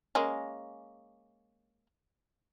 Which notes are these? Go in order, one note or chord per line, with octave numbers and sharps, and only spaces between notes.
G#3 A#3 C#4